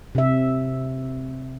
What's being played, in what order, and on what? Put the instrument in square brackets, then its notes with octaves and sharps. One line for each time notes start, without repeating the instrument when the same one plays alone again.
[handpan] C3 E5